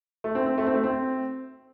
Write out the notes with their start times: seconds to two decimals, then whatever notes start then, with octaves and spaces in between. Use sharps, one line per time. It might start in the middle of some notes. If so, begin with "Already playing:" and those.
0.24 A3
0.35 C4
0.46 C4
0.58 A3
0.67 C4
0.74 A3
0.84 C4